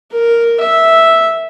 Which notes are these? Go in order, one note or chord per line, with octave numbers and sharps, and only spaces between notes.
A#4
E5